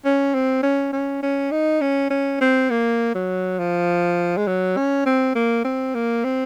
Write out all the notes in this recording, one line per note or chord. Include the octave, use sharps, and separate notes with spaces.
C#4
C4
C#4
C#4
C#4
D#4
C#4
C#4
C4
A#3
F#3
F3
G#3
F#3
C#4
C4
A#3
C4
A#3
C4